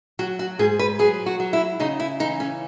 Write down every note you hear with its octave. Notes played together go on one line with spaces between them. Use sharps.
F#3 F#4
F#4
G#2 G#4
B4
F#3 G#4
F#4
F#3
E4
C#3 D#4
E4
E3 D#4
C#4